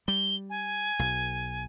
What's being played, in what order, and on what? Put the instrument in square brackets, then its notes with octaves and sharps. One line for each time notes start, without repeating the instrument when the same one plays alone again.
[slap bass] G3 [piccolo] G7
[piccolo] G#5
[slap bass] B1